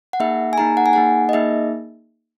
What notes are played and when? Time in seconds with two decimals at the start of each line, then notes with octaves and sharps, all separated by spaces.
0.13 F#5
0.20 A#3 D#4 G#4 E5
0.53 G#5
0.58 A#3 D#4 G#4 A#5
0.77 F#5
0.86 G#5
0.93 A#3 D#4 G#4 F#5
1.29 D#5
1.33 A#3 D#4 G#4 E5